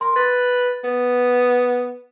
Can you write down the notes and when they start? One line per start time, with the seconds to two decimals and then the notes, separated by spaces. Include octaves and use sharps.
0.01 A#4 C6
0.16 B4 A6
0.84 B3